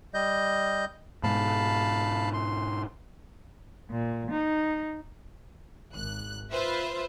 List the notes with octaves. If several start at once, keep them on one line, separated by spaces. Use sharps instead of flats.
G3 D#5 G6
G#2 B2 G#3 F5 A5 B5
C6
A#2
D#4
G#1 F#6
F4 B4 C5 E5